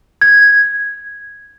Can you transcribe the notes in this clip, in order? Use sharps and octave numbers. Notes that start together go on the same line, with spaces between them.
G#6